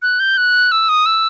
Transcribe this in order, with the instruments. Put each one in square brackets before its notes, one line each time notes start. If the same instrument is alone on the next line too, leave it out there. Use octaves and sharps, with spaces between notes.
[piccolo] F#6
G6
F#6
E6
D#6
E6